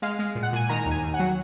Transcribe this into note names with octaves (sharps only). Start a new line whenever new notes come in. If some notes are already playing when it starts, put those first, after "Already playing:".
G#3 F5
G#3
A#2
F#5
A#2 G#5
D#3 A#5
D#2
G#5
D#2
F#5
F#3